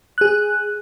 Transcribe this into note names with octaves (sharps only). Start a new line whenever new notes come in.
G#4 F#6